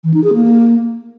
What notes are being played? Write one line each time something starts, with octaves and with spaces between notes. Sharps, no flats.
E3
D#4
G#4
A#3